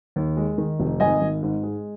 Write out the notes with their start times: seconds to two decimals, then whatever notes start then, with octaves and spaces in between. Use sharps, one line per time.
0.16 D#2
0.37 G#3
0.58 D#3
0.79 F1
1.00 G#1 D#5 G#5
1.21 G#1
1.42 G#2
1.63 G#3